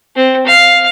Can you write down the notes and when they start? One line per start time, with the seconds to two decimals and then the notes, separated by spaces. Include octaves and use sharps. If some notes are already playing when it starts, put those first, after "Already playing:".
0.16 C4
0.47 F5